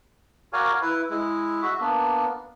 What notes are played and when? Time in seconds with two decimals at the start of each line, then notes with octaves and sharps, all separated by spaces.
0.53 F#4 A#4 D5 F5 G#5
0.82 E4 B4
1.10 G#3 E4
1.62 F#4 E5
1.80 A#3 B3 D4